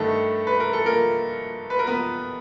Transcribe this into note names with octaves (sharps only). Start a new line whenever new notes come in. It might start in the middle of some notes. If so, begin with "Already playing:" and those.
Already playing: G2 D#3 A3 A4
B4
A#4
A4
A#3 A#4
B4
A#4
B3 B4